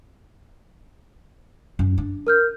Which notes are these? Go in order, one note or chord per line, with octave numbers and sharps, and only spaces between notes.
F#2
D4
A#4 F6 G6